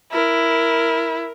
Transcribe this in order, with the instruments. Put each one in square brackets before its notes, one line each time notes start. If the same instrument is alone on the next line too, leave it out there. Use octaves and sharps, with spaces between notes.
[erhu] E4 [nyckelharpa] A#4